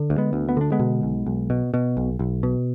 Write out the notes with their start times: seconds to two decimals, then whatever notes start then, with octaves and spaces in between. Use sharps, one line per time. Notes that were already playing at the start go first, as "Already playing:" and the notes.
Already playing: D3
0.10 D2
0.18 G#3 B3
0.33 D2
0.49 B3
0.57 D3 D4
0.72 G#3 B3
0.80 B2
1.03 B1
1.26 B1
1.50 B2
1.74 B2
1.97 B1
2.19 B1
2.43 B2